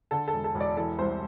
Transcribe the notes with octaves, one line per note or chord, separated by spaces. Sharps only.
D3 A4
A4
E1
A4
E1
D5
E3 A4
C2 C5